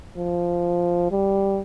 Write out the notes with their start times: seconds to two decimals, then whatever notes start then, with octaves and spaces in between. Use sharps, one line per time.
0.17 F3
1.11 G3